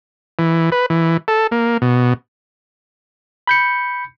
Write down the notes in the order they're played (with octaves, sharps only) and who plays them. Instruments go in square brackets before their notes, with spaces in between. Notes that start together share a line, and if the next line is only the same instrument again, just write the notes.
[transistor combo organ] E3
B4
E3
A4
A#3
B2
[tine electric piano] B5 G6 C#7